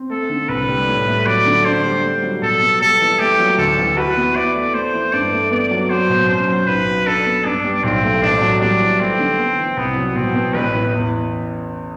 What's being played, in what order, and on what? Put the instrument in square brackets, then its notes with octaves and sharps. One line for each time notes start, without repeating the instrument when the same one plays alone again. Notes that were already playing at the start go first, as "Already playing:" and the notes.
Already playing: [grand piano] C4
[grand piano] A3 [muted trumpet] A4
[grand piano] D3
[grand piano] C2 [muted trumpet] B4
[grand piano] G3
A2
A3
[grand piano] F#3 [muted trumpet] D5
[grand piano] D3
[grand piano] D4 [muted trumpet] C5
[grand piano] G3
A3
F#3
[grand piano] B2 [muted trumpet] A4
[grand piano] B3
[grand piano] G3 [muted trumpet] A4
[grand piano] E3
[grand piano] A3 [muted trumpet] G4
[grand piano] F#3
[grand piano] D2 [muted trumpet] A4
[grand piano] E3
[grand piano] F#4 [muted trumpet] B4
[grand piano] B3
[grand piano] E4 [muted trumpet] D5
[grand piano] A3
[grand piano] A3 [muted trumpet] C5
[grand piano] E3
[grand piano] G2 [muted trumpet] D5
[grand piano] A3
[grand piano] B3 [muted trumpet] D5
[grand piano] F#3
[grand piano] F#3 [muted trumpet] C5
[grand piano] B2
[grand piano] F#2 [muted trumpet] C5
[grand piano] F#3
[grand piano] B1 [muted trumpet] B4
[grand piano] F#3
[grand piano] D4 [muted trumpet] A4
[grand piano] B3
[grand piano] G2 [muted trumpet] D4
[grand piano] G3
[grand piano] B1 [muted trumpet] C4
[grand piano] A3
[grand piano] A1 [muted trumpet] D4
[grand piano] F#3
[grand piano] G3 [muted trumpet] D4
[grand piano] E3
[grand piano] A3 [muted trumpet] C4
[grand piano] D3
B3
E3
[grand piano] C2 [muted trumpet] B3
[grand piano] F#3
[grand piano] B2 [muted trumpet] C4
[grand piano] B3
[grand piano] A1 [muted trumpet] B4
[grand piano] E3
E2